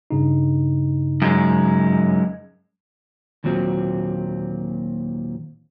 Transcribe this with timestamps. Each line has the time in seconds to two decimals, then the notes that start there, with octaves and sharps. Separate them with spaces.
0.11 G2 C#3 D#4
1.22 F#2 G#3
3.44 D#2 A#2 F#3 C4